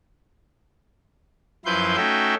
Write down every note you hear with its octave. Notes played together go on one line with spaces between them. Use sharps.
F#2 F3 E4 B4 C6 G6
A3 C#4 D#4 F#4 E5 G5